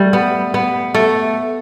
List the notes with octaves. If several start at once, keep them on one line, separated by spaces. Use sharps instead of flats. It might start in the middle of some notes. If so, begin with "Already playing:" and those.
Already playing: G3 A3
B3
B3
A3